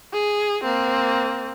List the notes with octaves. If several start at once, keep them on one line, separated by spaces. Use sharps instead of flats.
G#4
A#3 C4